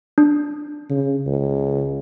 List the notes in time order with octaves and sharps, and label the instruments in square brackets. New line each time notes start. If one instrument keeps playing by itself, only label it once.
[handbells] D4
[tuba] C#3
C#2